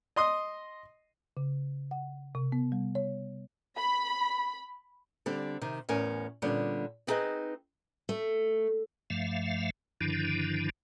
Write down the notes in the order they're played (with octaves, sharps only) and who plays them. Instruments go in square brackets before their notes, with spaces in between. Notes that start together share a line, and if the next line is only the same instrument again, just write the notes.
[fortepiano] D#5 C6 D#6
[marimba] C#3
F#5
C3
B3
G3
C#5
[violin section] B5
[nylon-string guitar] D3 G3 C4
C3 D#3
E2 A2 C#4 A#4 G#5
A#2 D3 G3 B3 C#4 F4
B3 C4 D#4 G#4 B4 D#5
[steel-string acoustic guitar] A3
[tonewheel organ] G2 F3 A3 E5 F5
G2 D3 D#3 F3 D4 E4